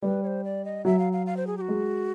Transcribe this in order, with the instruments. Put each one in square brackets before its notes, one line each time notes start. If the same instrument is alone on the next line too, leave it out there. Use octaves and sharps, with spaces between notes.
[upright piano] G3 [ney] B4
[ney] C#5
C5
D5
D#5
[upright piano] F#3 [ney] E5
[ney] F5
F5
F5
C5
G#4
G4
F#4
[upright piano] G#3